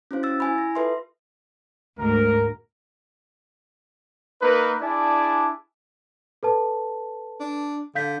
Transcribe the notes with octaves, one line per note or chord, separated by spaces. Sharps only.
C#4 E4 F#4 C5 F5
E6 A6
E4 G#5 B5
A#6
F4 A4 B4 E5 C6
D2 G#2 A#4
A#3 D#4 A#4 B4
D4 E4 G#4 D5 G#5 A5
A4 B4 A5
D4
D3 F5 G6 B6